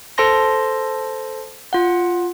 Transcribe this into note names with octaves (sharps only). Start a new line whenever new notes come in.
A4 C5 A5 C6 A#6
F4 F#5